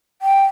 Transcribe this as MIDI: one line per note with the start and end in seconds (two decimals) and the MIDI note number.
0.22 0.45 79